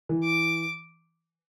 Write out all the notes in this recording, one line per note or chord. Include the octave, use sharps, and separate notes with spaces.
E3
D6